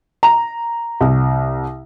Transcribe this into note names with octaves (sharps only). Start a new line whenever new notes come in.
A#5
C2